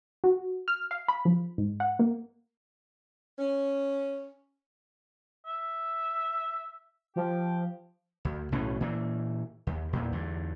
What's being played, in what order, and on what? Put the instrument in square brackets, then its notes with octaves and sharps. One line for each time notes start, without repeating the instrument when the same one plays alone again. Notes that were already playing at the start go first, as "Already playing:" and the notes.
[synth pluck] F#4
F6
F5
B5
F3
G#2
F#5
A#3
[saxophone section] C#4
[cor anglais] E5
[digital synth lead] F3 [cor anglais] G4
[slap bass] D2
B1 A2 E3 C#4
A#2 E3
D#2
E2 A#2
E2 G2 D3